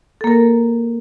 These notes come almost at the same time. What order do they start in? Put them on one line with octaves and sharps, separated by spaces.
A4 A#3 A#4